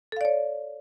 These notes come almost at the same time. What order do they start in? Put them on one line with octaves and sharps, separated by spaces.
A4 F5 D5 C#5